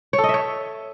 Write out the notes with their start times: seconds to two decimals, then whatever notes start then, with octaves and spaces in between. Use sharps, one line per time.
0.13 C#5
0.18 A4
0.24 D#5
0.29 E5
0.34 C#5